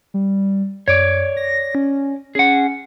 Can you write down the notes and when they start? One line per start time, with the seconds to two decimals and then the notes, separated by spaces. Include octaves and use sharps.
0.14 G3
0.88 F#2 C#5 D5
1.37 A#6
1.75 C#4
2.35 C#4 G#4 F#5